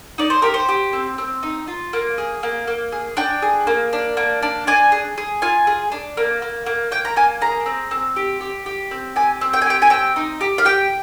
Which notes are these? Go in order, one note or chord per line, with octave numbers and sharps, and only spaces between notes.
D#4 D5
C5
G4 A#4
C5
G4
C4
C4
D#4
F4
A#3
G#4
A#3
A#3
G#4
D4 G5
G#4
A#3
D4
A#3
D4
D4 G#5
G#4
G#4
F4 G#5
G#4
D4
A#3
A#3
A#3
A#3 G5
A#5
A#3 G#5
G#4 A#5
C4
C4
G4
G4
G4
C4
G4 G#5
C4
G5
G#5
G4 G5
G#5
C4 G5
D#4
G4
F5
G4 G5